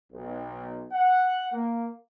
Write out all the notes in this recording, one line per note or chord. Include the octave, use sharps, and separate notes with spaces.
B1
F#5
A#3